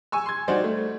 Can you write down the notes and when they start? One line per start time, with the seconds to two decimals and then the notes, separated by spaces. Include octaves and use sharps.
0.12 G#5 C#6 E6
0.26 C6 G#6
0.48 G3 D#4 F#4 C5 D5
0.64 A3